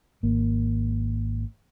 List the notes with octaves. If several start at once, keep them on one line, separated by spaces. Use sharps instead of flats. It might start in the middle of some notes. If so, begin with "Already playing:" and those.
G#1 A#3